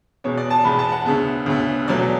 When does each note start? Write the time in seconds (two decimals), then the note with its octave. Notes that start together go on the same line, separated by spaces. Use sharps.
0.24 E2 B2 G#3 C#5
0.37 D5
0.50 A5
0.64 E2 B2 G#3 B5
0.79 A5
0.92 F#5
1.06 D2 C#3 G#3 B3
1.46 D2 C#3 G#3 B3
1.88 E2 B2 F#3 A3 D5